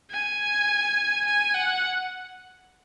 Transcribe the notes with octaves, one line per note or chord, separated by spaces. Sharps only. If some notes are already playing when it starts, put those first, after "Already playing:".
G#5
G#5
F#5